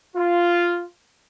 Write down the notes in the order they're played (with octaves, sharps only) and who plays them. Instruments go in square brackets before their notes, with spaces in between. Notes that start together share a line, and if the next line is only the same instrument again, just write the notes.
[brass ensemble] F4